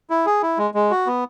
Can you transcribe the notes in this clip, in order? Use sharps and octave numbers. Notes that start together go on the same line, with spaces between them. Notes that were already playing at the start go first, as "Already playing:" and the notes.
E4
G#4
E4
G#3
G#3
F#4
B3